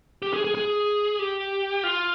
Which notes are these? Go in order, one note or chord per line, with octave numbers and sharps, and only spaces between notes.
G4
G#4
G#4
G#4
G4
F4